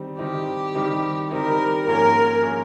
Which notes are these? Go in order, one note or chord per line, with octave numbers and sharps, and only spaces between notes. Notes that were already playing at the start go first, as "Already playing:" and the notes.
Already playing: D#3 G3 C4 D#4
D#3 G3 C4 D#4 G4
D#3 G3 C4 D#4
D#3 G3 C4 D#4 A#4
G#2 F3 A#3 C#4 G#4 A#4
F3 A#3 C#4 G#4